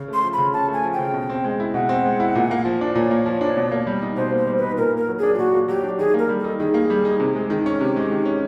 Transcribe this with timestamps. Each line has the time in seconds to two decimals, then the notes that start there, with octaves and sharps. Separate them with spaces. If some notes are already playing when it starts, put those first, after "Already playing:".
Already playing: C#3
0.08 A3
0.14 C6
0.24 F3
0.33 B5
0.38 C#3
0.53 C#3 A5
0.68 A3 G#5
0.84 F3
0.93 G5
0.99 C#3
1.13 B2
1.30 C4
1.44 G#3
1.60 E4
1.74 B2 F#5
1.89 C4
2.05 G#3
2.20 E4
2.35 A#2
2.51 A#3
2.65 F3
2.81 D4
2.95 A#2 C#5
3.11 A#3
3.26 F3
3.41 D4
3.57 B2
3.72 A#3
3.87 G3
4.02 D#4
4.17 B2 C5
4.32 A#3
4.37 C5
4.47 G3
4.58 D#4 B4
4.77 A#2 A#4
4.92 A#3 A#4
5.08 F#3
5.19 D4 G#4
5.35 F4
5.38 A#2 F#4
5.54 A#3
5.68 F#3 G4
5.83 D4
5.98 D#3 G#4
6.14 A#3 A#4
6.29 G3
6.39 D#4 A4
6.59 D#3 G#4
6.74 A#3
6.90 G3
7.05 D#4
7.20 C3
7.35 G#3
7.50 D#3
7.66 C#4
7.80 C3 G4
7.96 G#3
8.11 D#3
8.25 C#4